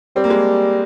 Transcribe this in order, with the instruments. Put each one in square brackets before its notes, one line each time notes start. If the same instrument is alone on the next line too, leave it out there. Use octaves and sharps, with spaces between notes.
[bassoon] G3 [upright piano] C4
[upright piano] A#3
G#3